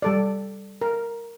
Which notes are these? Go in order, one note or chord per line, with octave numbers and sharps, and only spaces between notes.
G3 A4 D5
A#4